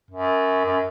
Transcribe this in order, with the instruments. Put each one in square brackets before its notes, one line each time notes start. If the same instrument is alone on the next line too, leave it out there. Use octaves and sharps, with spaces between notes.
[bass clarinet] F#2
F#2